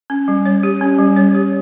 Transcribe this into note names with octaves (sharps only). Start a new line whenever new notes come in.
C#4
G3
C#5
G4
C#4
G3
C#5
G4